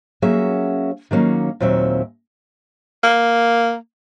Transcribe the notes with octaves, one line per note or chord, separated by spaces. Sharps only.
F#3 A#3 C#4 F#4 G#4 E5
D#3 F#3 A#3 C#4 D#4
D#2 A#2 F#3 C4 E5
A#3